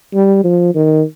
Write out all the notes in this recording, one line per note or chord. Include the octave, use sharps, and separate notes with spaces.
G3
F3
D#3